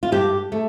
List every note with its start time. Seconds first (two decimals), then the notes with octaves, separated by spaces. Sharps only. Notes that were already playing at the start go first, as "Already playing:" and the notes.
0.03 F4
0.12 G2 G4
0.52 A3